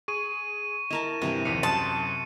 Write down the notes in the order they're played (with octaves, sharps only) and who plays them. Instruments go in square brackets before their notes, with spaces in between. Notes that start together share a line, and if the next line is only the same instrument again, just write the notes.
[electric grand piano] G#4 [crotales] C#6 D#7
[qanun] E4 A#4 A5 [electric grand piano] D#5 A#5 [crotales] E7
[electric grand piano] G2 [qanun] C3 E3 A#4
[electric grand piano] A#1 D#2 [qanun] F5 [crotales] C#7 D#7
[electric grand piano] F#2 C6 D#6 [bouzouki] A5